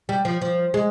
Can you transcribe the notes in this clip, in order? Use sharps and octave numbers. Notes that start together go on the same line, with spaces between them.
G3
F3
F3
G#3